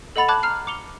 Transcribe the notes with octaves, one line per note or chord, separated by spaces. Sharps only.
A4 D#5 F#5 B5 A6 F7
A5 B5 D6 F#6 G#6
A#5 F6 C7
D6 C#7 F7 G7